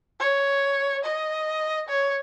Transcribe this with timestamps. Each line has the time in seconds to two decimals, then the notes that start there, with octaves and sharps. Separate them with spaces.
0.19 C#5
1.03 D#5
1.88 C#5